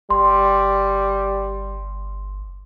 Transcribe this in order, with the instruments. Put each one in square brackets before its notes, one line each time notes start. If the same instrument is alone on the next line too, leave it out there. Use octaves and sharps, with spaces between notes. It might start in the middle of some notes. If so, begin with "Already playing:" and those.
[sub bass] G1 [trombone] G3 [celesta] C6